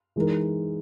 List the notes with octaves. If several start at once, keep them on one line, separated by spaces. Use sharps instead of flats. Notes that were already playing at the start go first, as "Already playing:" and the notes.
E3 G#3 D#4 A#4